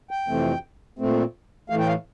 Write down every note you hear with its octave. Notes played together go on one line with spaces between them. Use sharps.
G5
F2 C3 E3 A3 C4
A#2 A3 C4
A2 E3 A3 F5
G5
F5